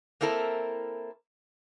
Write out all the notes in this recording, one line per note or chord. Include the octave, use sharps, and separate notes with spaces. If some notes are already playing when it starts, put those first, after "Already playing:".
A#3 C4 E4 A4 A#4